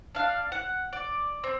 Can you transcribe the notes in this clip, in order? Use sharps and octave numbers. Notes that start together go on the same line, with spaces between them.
D4 F5
F#5
D5
C4